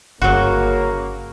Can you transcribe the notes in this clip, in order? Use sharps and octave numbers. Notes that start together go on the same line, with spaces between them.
G1 C#3 F#3 A#3 F#4